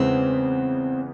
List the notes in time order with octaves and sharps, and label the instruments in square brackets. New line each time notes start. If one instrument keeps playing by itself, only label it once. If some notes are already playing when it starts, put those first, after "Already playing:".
Already playing: [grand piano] E2 C#3 E3 G#3 B3 [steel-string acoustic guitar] C4